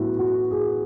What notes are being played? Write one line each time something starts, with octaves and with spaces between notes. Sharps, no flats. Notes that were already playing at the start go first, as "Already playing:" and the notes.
Already playing: A2 F#3 B3 E4 F#4
F#4
G#4